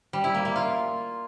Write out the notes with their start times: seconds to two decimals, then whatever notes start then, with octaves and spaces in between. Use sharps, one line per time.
0.13 G3
0.24 E4
0.34 A#3
0.45 A#3
0.56 F4